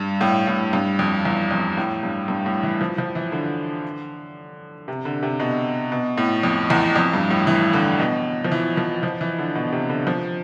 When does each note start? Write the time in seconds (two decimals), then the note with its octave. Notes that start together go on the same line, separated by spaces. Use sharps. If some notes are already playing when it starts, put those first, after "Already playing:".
Already playing: G2
0.21 A2
0.47 A2
0.73 G2
0.99 F2
1.25 E2
1.51 F2
1.77 A2
2.03 G2
2.28 G2
2.46 A2
2.63 E3
2.81 F3
2.98 F3
3.15 E3
3.32 D3
4.88 C3
5.05 D3
5.22 C3
5.40 B2
5.92 B2
6.18 A2
6.43 F2
6.70 E2
6.96 F2
7.13 G2
7.30 A2
7.47 E3
7.73 D3
7.99 B2
8.44 F3
8.52 E3
8.77 F3
9.03 F3
9.21 E3
9.38 D3
9.55 B2
9.72 C3
9.89 D3
10.07 F3